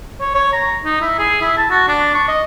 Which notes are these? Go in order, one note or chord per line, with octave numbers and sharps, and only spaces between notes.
C#5
C#5
A#5
D#4
E4
G#4
E4
A5
F#4
D4
C#6
D#5